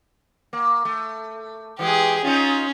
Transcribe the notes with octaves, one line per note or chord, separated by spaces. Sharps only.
A#3
A3
E3 G#3 G4 G#4
C#4 D#4 F4